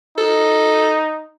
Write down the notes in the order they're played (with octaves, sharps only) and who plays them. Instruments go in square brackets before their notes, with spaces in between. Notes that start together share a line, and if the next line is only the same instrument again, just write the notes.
[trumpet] D#4 [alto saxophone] A4